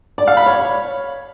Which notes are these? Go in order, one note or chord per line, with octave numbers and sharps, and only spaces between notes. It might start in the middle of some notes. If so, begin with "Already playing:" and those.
D5
F5
B5
C#5